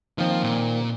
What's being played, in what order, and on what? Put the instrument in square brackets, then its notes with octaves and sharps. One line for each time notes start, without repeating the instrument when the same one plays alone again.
[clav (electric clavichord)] D#3 A#3 C4 [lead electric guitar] F3
[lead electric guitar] A#2